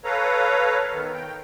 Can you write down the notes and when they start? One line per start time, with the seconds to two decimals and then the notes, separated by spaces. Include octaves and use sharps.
0.04 A4 B4 C#5 F5 A#5
0.92 D#3 B3
1.13 G5